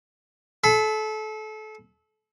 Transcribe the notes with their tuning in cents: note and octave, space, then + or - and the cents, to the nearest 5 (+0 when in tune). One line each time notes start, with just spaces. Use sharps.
A4 -30 B5 +25